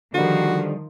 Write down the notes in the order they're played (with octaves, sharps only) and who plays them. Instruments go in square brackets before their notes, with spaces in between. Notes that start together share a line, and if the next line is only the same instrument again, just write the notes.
[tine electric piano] D3 G3 [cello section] D#3 F3 [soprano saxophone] F#4